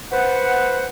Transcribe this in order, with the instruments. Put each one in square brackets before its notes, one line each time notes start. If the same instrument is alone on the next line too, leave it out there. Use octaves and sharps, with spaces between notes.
[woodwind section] B4 C5 F#5